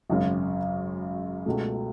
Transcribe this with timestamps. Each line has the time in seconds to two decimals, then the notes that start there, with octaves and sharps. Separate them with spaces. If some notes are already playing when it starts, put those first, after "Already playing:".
0.09 G#1 F#2 C#3
1.46 C#2 B2 A3